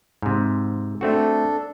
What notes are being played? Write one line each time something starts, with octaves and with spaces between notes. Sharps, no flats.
G#2 C3
A3 C4 D4 F#4 A4